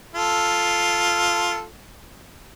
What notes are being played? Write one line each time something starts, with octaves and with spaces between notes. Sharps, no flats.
F4 A4